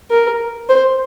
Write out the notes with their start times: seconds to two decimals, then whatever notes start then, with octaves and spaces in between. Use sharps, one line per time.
0.11 A#4
0.69 C5